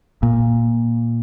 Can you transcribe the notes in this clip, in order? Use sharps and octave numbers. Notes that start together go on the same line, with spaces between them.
A#2